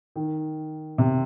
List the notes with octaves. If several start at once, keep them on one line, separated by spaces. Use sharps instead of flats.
D#3
C3